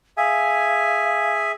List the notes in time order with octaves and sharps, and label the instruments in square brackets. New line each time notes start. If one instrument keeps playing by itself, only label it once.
[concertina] G#4 E5 G#5 [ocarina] F5